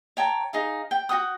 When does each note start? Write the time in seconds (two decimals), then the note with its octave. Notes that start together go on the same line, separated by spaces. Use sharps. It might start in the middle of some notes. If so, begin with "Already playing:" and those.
0.17 C#5 G5 A5 A#5
0.53 D#4 G#4 F5
0.91 G5
1.09 F#4 F#5 G5 D#6